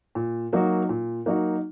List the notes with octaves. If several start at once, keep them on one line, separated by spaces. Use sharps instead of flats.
A#2
F#3 A#3 D#4 F#4
A#2
F#3 A#3 D#4 F#4